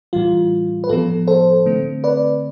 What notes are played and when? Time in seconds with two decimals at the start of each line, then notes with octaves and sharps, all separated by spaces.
0.13 A2 E3 G3 F4
0.84 B4
0.89 A2 F3 B3 F4 A4
1.27 A4 C5
1.66 D3 A3 C4
2.04 B4 D5